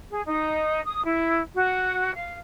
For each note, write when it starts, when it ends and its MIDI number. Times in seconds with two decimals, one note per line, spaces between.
0.11 0.21 68
0.27 0.80 63
0.85 1.03 87
1.04 1.39 64
1.54 2.13 66
2.14 2.36 77